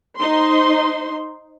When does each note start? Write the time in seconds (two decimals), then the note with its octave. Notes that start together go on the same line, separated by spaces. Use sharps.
0.18 D#4 C5 C6